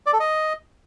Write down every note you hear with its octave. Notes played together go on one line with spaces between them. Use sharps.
D5
A4
D#5